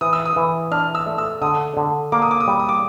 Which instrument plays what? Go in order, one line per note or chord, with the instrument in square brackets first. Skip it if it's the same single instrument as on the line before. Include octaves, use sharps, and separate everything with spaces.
[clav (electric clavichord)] E3 [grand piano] D#6
[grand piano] E6
D#6
[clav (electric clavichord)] E3
[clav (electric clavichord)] D4 [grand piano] F6
[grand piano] E6
[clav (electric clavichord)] A3
[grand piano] E6
[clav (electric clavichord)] D3 [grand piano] D#6
[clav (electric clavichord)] D3
[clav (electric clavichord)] A#3 [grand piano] D6
[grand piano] D#6
D6
D#6
[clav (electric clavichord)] G3 [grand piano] D6
[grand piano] D#6
D6